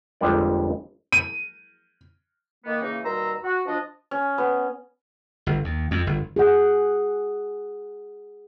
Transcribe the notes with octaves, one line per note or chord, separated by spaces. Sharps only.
G1 F2 G3 G#3 D5
D#7
D#3 A#3 B3
C#3 E3 A#3 C#4 D#4
D#2 B2 G3 A#5 C6 E6
F#4
F3 D4 D#5
C#4
B3
G1
D#2
F2
G1
G#4 F#5